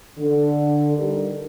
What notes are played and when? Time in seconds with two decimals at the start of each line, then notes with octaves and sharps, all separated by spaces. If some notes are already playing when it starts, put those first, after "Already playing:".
0.18 D3
0.98 G3 D4 D#4 G4 A4 A#4